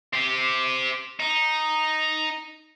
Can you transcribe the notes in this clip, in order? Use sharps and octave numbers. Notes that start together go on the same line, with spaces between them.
C4 G4
D#4